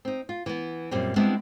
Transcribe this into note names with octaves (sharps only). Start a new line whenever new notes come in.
C4 D#4
F4
E3 B3
F#2 A#2 G3 C4
G3 G#3 B3 C4 D4 E4